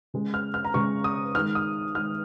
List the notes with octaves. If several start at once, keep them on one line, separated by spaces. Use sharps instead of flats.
C#3 G#3
F6
F6
A#5
C#3 G#3 C#6
D#6
D#3 G#3 F6
D#6
D#3 G#3 F6